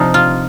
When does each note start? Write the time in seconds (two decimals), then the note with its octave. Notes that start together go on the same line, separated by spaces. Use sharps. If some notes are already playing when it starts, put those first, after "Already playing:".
Already playing: C3 F3 D#4
0.14 F4